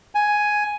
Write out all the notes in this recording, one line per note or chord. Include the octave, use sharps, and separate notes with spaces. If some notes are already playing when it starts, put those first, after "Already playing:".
G#5